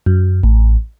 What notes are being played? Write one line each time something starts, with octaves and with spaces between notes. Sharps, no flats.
F#2
A1